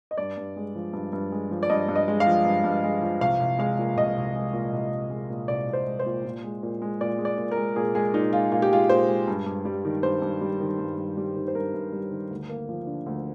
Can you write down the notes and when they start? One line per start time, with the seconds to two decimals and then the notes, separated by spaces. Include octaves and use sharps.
0.11 D#5
0.18 G2 D5
0.37 G2
0.56 G#3
0.75 F3
0.93 G2
1.13 G2
1.32 G#3
1.51 F3
1.63 D5
1.70 G2 D#5
1.89 G2
1.96 D#5
2.08 G#3
2.20 F5
2.26 F3
2.45 G2
2.64 G2
2.84 G#3
3.02 F3
3.21 C2 F5
3.40 C2
3.59 G#3 F5
3.79 A#2
3.97 C2 D#5
4.17 C2
4.36 G#3
4.53 A#2
4.73 C2
4.92 C2
5.10 G#3
5.30 A#2
5.48 C2 D5
5.67 C2
5.73 C5
5.87 G#3
5.99 C5
6.06 A#2
6.25 A#2
6.44 G#3
6.63 A#2
6.82 G#3
7.01 A#2 D5
7.19 G#3
7.25 D5
7.38 A#2
7.51 A#4
7.57 G#3
7.76 A#2 G#4
7.94 G#3 G#4
8.14 A#2 D#4
8.33 G#3 F4
8.52 A#2 F4
8.62 G4
8.71 G#3 F4
8.89 A#2 C5
9.08 G#3
9.28 G2
9.46 G2
9.65 G3
9.85 D#3
10.03 G2 C5
10.22 G2
10.41 G3
10.61 D#3
10.79 G2
10.98 G2
11.17 G3
11.37 D#3
11.48 C5
11.55 G2 A#4
11.74 G2
11.92 G3
12.11 D#3
12.30 D2
12.49 A#3
12.69 F3
12.87 D3
13.06 D2